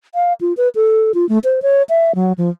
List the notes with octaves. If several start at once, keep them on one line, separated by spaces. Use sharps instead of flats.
F5
F4
B4
A4
F4
A3
C5
C#5
E5
F#3
F3